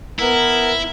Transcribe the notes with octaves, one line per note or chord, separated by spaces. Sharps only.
B3 E4 A#4